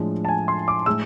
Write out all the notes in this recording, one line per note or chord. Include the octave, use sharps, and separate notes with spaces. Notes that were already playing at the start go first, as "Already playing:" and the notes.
Already playing: A2 F3 G#3 D4
A5
G#5
C6
D6
A2 G#3 E6